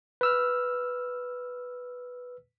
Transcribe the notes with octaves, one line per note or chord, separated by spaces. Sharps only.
B4 E6 F6